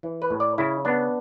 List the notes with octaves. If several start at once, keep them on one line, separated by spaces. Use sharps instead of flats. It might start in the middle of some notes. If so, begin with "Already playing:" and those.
E3
B4
A2
D5
C#3 E4
B3 D4